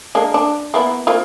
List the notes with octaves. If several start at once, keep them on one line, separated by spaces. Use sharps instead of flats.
G#3 A#3 D4
D4
A#3 B3 E4
A#3 C4 F4